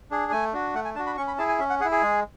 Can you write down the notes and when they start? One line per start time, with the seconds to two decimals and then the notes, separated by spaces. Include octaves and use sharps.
0.11 D4 G#4
0.32 A3 G#5
0.53 D4 F#4
0.74 A3 F#5
0.85 G#5
0.95 D4 A5
0.99 F#4
1.07 B5
1.17 C#4 C#6
1.27 B5
1.38 E4 G#4 A5
1.49 G#5
1.59 C#4 E5
1.70 F#5
1.81 G#4 F#5
1.85 E4
1.91 G#4
2.02 G#3